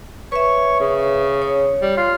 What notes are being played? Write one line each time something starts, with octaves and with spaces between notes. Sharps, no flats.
B4 C#5 E5
C#3
C#5
G3
F4